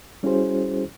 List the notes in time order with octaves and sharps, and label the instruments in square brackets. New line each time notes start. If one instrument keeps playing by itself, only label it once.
[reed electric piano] G3 C#4 E4 F#4 G#4 C5